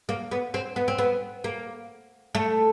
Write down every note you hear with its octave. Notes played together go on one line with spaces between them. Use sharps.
A#3
B3
C4
B3
C4
B3
A#3
A3